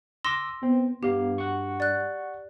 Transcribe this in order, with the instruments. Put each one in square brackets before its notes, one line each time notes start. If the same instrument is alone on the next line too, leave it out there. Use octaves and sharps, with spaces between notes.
[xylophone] C6 A#6 [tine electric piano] D6 E6
[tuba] B3 [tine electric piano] C4
[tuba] G2 [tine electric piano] B3 F5 [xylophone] G4
[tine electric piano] F#5 C#6
[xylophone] D5 F#6